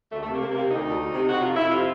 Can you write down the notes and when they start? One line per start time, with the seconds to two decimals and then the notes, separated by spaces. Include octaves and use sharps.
0.12 D2 A3
0.23 A3
0.27 C3 A#3
0.41 C3
0.51 A#3
0.56 C3
0.70 D2 D#4
0.85 D2
1.00 D2
1.14 C3
1.29 C3 F#4
1.42 F2 F4
1.55 F2 E4
1.69 C3 F4